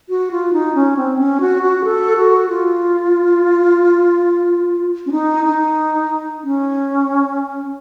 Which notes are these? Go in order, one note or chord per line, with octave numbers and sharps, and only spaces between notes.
F#4
F4
D#4
C#4
C4
C#4
F#4
F#4
A4
F#4
F4
C#4
D#4
D#4
C#4